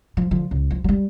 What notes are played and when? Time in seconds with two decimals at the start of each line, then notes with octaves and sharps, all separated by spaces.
0.17 F3
0.31 D3 F3
0.51 C#2
0.71 F3
0.84 F#3 G3